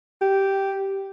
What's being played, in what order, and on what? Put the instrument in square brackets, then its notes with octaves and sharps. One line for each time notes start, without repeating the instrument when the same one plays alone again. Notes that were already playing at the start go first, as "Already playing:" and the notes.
[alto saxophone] G4